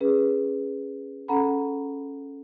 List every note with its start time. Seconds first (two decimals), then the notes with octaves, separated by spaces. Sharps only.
0.01 C#4 G#4 B4
1.28 C#4 A4 F#5 A#5 B5